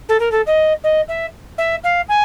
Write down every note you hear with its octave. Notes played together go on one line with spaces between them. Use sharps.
A4
A#4
A4
D#5
D#5
E5
E5
F5
G#5